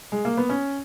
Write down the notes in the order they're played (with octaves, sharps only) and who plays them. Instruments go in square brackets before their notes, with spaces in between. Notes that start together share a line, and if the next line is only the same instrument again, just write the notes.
[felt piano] G#3
A#3
B3
C#4